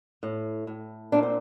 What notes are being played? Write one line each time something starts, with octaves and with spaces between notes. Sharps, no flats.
A2
A2
A#2 D4
C4